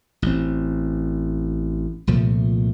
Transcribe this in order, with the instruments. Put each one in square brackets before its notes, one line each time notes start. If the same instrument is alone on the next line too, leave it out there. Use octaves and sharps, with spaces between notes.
[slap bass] A1 C4
C2 A#2 F3 A3